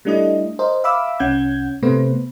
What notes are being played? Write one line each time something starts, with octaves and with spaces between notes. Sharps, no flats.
G3 A3 D4 E4 D#5
A#4 C5 D#5
E5 F5 B5 D6 E6
C2 C#4 F#5 G6 G#6
C3 A3 B3 B4 C5